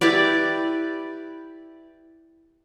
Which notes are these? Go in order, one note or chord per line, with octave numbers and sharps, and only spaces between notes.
E4 G4 B4 D5